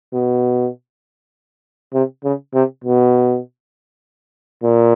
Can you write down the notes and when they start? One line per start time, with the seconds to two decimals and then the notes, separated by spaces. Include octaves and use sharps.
0.14 B2
1.94 C3
2.24 C#3
2.54 C3
2.84 B2
4.63 A#2